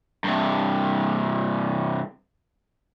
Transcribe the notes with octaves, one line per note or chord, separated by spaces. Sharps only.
G2 C3